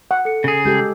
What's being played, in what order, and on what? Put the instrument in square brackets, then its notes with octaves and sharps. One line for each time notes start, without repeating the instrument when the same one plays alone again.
[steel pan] F#5
[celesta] A4 C#7
[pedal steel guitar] C#3 G#4
[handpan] G#3 G4 A4 [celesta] G6